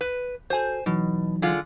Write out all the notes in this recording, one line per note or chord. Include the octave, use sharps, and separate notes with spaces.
B4
F#4 A4 C5 G#5
B2 E3 F#3 D#4
D3 G#3 F4